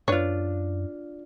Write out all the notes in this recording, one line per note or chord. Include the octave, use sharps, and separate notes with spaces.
F#2 D4 F4 B4 C#5